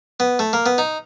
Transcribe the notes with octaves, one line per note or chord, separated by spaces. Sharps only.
B3
A3
A#3
B3
D#4